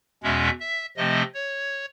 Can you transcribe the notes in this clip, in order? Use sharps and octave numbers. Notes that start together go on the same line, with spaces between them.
E2 B2 G#3 C#4 E5
E5
C3 F3 A3 C4 D#5
C#5